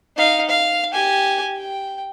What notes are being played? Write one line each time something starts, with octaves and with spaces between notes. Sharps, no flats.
D#4 F5
F5
G4 G#5
G5